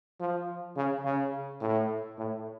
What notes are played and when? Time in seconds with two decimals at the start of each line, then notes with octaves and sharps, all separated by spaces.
0.20 F3
0.76 C#3
1.05 C#3
1.61 A2
2.18 A2